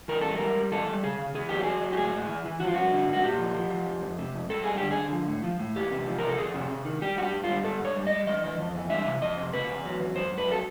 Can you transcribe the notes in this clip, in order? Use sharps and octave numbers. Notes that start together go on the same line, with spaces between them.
E3 A#4
G3 A4
G3 A#4
G3
E3 A4
G3
C#3 G#4
C#3
E2 G#4
F#3 G4
F#3 G#4
F#3
G4
A2 G#4
A2
E3
E3
F3 F#4
F4
G2 F#4
D3
G2
F#4
A#2 G4
F3
F3
F3
F2
F2
C3
F2
G2 A4
G3 G#4
D3 G4
G#4
D3
F3
A2
F3
A2
E2 G4
C3
F3
C3 A#4
A4
F2 G#4
C3
C3
D#3
G3 G4
G2 F#4
G4
G2
F4
G3
G2 A4
G2 C#5
G3
D#5
G3
E3 D#5
E3
F2
E3
G3 E5
C3
F2 D#5
C3
C#3 B4
E2
F#3
E2
F#2 C5
F#2
B4
F#3 A4